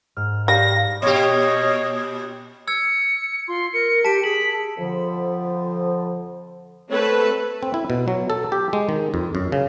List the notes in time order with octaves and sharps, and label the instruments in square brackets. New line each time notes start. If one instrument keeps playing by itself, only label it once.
[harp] G#2 F6
[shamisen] G3 [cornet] F5 [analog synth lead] A#6
[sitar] A#2 G4 [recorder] C#5 [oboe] D#5
[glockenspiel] E6 G#6 [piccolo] C#7
[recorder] F4 [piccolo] C6
[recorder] A#4 [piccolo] C#7
[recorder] G4 [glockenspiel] A5 D7 [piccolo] B6
[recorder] G#4 [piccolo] B6 [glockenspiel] F#7
[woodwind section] F2 D3 F3
[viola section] A3 A4 B4 [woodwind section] C4 C#5
[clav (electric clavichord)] C4
E4
B2
F#3
A4
G4
G#3
D#3
F2
F#2
C#3